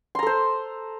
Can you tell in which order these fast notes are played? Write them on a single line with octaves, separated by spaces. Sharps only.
C6 A#5 A4 C5